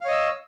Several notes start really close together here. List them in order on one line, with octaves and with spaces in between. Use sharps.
F5 C#5 D#5 E6